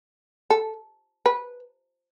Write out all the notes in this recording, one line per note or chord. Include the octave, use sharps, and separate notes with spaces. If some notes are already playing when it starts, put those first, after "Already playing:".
A4
B4